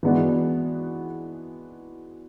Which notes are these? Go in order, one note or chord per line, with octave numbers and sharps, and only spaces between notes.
E3 G#3 B3 D4 F#4